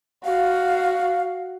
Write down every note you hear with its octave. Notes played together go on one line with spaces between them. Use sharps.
F#4 F5